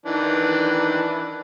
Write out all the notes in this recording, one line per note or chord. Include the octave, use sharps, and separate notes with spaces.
D#3 E3 D4